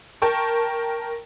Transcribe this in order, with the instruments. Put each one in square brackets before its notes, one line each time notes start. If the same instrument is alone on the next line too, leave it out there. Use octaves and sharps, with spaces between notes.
[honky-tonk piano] A#4 G5 A5 C#6